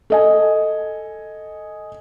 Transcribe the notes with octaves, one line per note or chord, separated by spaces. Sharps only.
A4 D#5 G#5